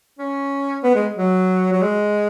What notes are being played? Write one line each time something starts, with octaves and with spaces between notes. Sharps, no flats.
C#4
B3
G#3
F#3
F#3
G#3